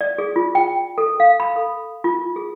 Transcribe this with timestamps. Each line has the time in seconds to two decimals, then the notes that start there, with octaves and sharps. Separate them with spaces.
0.01 D5
0.18 G#4
0.36 F4
0.55 G5
0.98 A4
1.20 F5
1.40 B5
1.56 A4
2.04 F4
2.36 G#4